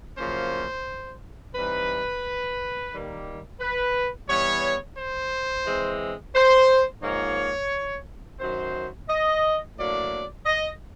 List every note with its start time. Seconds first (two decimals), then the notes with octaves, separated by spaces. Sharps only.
0.17 F#2 C#3 F3 A#3 C#4 C5
1.55 E3 G3 C4 D#4 B4
2.92 D#3 G3 A#3
3.60 B4
4.29 E3 G3 B3 C#5
4.98 C5
5.66 E3 G#3 C4
6.35 C5
7.03 G#2 F3 A#3 D#4 C#5
8.40 F#2 D#3 F#3 C5
9.09 D#5
9.77 A2 F#3 A#3 D4 D5
10.46 D#5